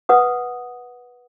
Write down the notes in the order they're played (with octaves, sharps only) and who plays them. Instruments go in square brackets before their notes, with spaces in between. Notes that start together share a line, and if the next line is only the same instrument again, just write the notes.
[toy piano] B4 F#5 D#6